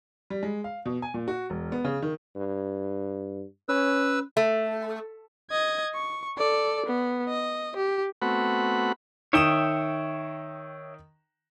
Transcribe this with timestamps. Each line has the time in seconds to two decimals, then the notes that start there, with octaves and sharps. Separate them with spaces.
0.30 G3
0.43 G#3
0.64 F5
0.86 B2
1.02 G#5
1.14 A#2
1.28 F#4
1.50 E1
1.72 B3
1.84 C#3
2.02 D#3
2.35 G2
3.69 C#4 B4 E6
4.37 A3
5.51 D#5 G#6
5.95 C#6
6.38 A4 D5
6.86 B3
7.28 D#5
7.76 G4
8.22 A3 B3 C4 F#4 F#5 B5
9.33 D#3 C#5 E5 G5 D#6 E7